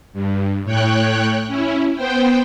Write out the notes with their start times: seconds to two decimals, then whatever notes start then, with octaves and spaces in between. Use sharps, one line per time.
0.13 G2
0.64 A2 C#5 G5 F#6
1.47 C#4 E4
1.95 B3 C5 G5